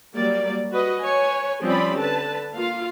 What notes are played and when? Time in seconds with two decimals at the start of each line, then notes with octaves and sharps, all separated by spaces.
0.15 F#3 G3 A#3 D5
0.70 F#4 B4 D#5
1.02 B4 C#5 G#5
1.63 F3 G3 C4 C#4 D5 B5
1.97 D3 B4 A5
2.54 A#3 F4 F5